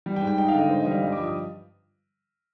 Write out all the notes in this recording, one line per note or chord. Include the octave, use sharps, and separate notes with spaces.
G3
G5
G#2
G5
D#4 G5
F5
D3 D#5
G#2 C5
D#5
G3
F5
G2 D#5
D6
F3
D#6